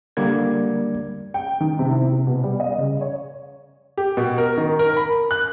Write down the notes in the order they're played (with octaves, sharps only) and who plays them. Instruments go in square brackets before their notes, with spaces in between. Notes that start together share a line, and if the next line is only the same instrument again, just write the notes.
[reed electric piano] D3 G3 A#3 D5 G#6
[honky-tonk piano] G5
D#3
C3
E4
C3
B2
G3
D#5
C#3
C#5
[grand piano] G4
B2
A#4
D#3
A#4
B5
F#6